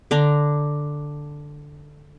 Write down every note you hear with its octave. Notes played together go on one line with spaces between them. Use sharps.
D3 D4 A#5